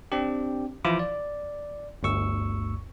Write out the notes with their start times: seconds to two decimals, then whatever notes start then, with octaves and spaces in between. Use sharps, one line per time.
0.12 C4 D4 G4
0.85 E3 F3 E4 F4 D6
0.99 D5
2.03 G1 D2 C#6 E6